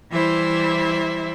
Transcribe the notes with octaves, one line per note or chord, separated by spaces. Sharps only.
E3 G3 E4 C5 E5